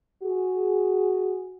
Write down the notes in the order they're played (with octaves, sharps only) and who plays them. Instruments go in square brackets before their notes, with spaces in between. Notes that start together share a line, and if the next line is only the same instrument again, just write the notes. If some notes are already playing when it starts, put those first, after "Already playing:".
[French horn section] F#4 G#4